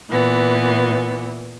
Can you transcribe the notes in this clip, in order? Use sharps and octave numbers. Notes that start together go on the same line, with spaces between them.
A#2 E3 B3